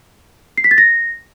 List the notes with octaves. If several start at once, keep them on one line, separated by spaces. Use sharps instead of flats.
C7
B6
A6
A#6